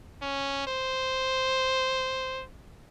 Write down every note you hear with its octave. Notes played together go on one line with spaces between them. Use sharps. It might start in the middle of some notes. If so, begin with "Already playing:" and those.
C#4
C5